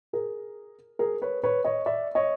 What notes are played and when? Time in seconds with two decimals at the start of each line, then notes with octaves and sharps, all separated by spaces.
0.13 G#4 A#4
0.99 G#4 A#4
1.22 B4 C#5
1.43 B4 C#5
1.65 C#5 D#5
1.86 D5 E5
2.15 C#5 D#5